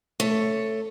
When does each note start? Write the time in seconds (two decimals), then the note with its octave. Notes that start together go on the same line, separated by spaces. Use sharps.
0.20 A3 C#5